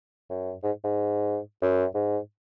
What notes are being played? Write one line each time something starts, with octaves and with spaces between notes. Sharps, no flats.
F#2
G#2
G#2
F#2
G#2